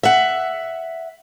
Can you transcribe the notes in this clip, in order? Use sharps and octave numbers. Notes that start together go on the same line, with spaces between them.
E5 F#5